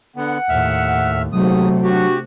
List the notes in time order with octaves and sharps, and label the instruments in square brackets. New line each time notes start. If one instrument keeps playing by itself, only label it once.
[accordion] D3 B3 [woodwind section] F#5
[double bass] D#2 A2 [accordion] E5 E6 F6
[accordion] D#2 G#2 D#6 [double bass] C3 A3 [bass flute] F#3
[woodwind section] D4 F#4 [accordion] G4